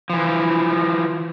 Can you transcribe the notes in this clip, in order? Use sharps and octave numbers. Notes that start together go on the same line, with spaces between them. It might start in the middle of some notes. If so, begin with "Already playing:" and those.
E3 F3